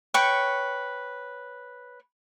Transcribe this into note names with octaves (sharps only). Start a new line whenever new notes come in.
B4 C#5 G5 C#6